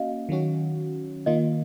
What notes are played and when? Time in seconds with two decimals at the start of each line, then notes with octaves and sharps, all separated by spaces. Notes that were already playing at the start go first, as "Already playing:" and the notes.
Already playing: A#3 C#4 F#4 D#5 F5
0.29 D#3 F#3 C#4 F#4
1.26 D#3 A#3 F4 D#5